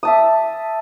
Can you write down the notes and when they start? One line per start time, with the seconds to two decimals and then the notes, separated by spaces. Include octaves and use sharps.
0.03 E5 A5 D#6